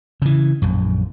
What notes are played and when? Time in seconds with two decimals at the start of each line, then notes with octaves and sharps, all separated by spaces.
0.22 C#3 E3
0.62 A#1 F#2